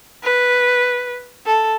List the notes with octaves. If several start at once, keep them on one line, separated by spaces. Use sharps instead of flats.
B4
A4